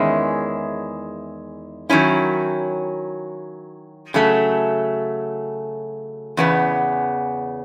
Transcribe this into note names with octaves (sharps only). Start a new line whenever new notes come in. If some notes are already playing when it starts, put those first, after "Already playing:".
Already playing: E2 D#3 G#3 C#4 E4
D#3 F#3 C#4 E4
C#3 F#3 A3
E2 C#3 B3